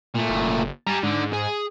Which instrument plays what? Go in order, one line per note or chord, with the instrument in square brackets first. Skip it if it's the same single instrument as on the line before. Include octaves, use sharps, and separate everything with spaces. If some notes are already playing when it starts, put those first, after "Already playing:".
[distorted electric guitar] A#2 A3
[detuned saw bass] F#1
[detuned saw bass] G3 [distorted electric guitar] G#5 A#5
[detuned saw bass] G#2 [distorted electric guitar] D3
[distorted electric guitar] G#4